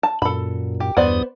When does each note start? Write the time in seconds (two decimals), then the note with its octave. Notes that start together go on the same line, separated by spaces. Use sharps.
0.03 A5
0.22 F#2 A#2 A4 B5
0.80 G4
0.97 E2 G2 B3 C5 D5 D#6